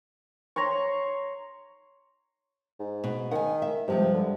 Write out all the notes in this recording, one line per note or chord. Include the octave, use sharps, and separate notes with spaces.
C#5 A#5 C6 C#6
G#2
B2
D#3 F#5 G#5
E5
G2 C3 F3 G#3
D3